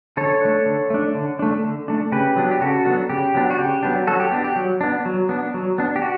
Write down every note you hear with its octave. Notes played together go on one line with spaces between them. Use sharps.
D3 A4 C#5
A3 D4
D3
A3 D4
D3
A3 D4
D3
A3 D4
C#3 G4 B4
F#3 B3 D4
G4
C#3 F#4 A4
F#3 B3 D4
C#3 G4
F#3 B3 D4
F#4
C#3 G4
F#3 B3 D4
F#3 F#4 A4
G4
B3 D4
G4
F#3
B3 D4
F#3
B3 D4
F#3
B3 D4
G4
F#4